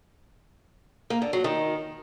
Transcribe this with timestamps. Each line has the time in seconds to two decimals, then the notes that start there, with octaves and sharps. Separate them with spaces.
1.10 A#3
1.22 D3
1.33 F#3
1.44 D#3